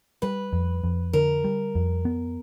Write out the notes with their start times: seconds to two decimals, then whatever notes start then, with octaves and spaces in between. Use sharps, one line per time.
0.22 G3 B4
0.53 F2
0.84 F2
1.13 D3 A#4
1.44 G3
1.75 F2
2.05 B3